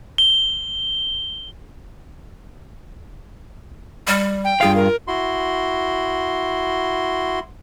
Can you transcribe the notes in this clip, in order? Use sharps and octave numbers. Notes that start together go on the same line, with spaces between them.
G7
G3
G5
G2 F4 G#4 F5
A#4
E4 F#4 C6